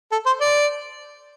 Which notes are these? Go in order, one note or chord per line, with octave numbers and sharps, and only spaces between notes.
A4
C5
D5